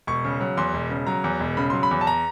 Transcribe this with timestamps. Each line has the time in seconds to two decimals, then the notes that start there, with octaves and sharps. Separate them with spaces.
0.07 E1 C#6
0.24 C#3
0.41 F#3
0.57 E2 C6
0.74 E1
0.90 C#3
1.07 F#3 A#5
1.24 E2
1.40 E1
1.57 C#3 B5
1.70 F#3 C6
1.83 B5
1.91 E2
2.01 A5
2.07 A#5